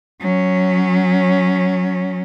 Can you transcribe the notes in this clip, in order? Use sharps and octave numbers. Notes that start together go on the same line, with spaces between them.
F#3 C#4